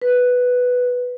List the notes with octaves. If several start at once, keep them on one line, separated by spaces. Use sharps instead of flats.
B4